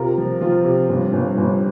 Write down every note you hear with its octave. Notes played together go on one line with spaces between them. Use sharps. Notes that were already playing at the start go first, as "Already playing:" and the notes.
Already playing: C3 F4 A#4
F3
F3 C4 F4
C3
G1
G1
G1